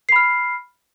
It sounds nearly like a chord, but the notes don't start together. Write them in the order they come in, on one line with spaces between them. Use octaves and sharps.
C7 B5 F6